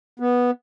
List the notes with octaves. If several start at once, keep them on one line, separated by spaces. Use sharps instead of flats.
B3